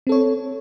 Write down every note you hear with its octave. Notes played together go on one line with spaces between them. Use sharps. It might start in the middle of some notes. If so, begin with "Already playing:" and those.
C4 A4 C#5